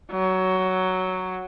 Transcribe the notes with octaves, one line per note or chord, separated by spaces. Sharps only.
F#3